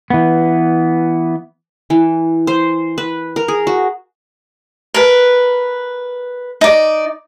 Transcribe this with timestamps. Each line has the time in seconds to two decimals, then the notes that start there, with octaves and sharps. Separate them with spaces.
0.10 E3 B3
1.90 E3
2.47 C5
2.98 B4
3.36 A#4
3.48 G#4
3.67 F#4
4.94 A#4 B4
6.61 D#4 D5